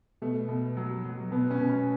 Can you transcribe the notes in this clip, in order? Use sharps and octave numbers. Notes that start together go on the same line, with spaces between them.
B2 A3
B2
F#3
F#3
B2 B3
C#4
B2
C#4